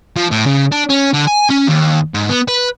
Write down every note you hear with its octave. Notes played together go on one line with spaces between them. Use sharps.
F3
A2
C#3
D4
C#4
D3
G#5
C#4
D#2
G#2
B3
B4